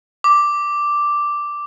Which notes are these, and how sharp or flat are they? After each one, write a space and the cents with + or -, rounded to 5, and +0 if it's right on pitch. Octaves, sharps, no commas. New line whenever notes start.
D6 +0